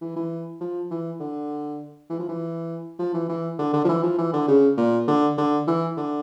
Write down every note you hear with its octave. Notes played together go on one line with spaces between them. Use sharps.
E3
E3
F3
E3
D3
E3
F3
E3
F3
E3
E3
D3
D3
F3
E3
F3
E3
D3
C#3
A#2
D3
D3
E3
D3